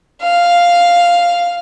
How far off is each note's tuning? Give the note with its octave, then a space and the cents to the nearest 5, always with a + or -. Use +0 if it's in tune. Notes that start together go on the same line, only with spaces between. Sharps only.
F5 +0